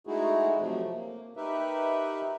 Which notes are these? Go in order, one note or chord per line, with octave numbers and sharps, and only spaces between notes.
G#3 A3 D#4 E4 F#4 G#4
C3 F3 F#3 A3
A#3
D#4 G4 A#4 B4 E5